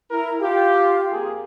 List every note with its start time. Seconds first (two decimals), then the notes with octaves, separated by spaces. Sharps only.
0.11 E4 A#4
0.40 F4 G4 F5
1.12 F2 A#3 G#4